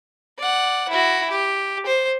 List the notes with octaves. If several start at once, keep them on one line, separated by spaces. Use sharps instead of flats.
D5 F#5
E4 F#4
G4
C5